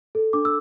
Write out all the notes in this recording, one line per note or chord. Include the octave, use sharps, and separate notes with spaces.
A4
D4 D6
E6